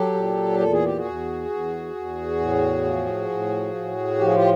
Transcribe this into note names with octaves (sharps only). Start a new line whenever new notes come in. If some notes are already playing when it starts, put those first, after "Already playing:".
Already playing: F#3 G4 A4
A#2
E2 A4
G#4
G4
F#4 G#4
E2
E2
E2
A2
F3
A2
A2
F3 G4
G#4
F4 G4